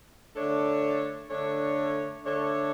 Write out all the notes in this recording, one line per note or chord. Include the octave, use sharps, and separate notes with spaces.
D3 A3 D4 A4 C#5
D3 A3 D4 A4 C#5
D3 A3 D4 A4 C#5